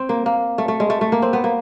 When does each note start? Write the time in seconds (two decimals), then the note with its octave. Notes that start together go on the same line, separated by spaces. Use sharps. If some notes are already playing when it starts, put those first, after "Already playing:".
Already playing: C4
0.09 A#3
0.26 A#3
0.58 A3
0.68 A3
0.80 G#3
0.90 A3
1.01 A3
1.12 A#3
1.22 C4
1.33 B3
1.44 A#3